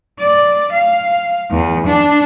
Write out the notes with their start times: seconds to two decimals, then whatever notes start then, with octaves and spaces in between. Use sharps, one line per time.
0.19 D5
0.72 F5
1.51 E2
1.86 D4